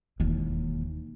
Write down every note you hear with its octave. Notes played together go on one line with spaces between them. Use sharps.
E1 D#2 E3